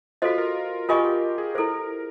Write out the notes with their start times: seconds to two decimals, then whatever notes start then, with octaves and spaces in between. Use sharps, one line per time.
0.22 F4 F#4 A4 C5 D#5
0.38 A#4
0.89 F4 G4 A#4 D#5 G#5 C#6
1.05 G4
1.38 G#4
1.55 E4 A4 A#4 C5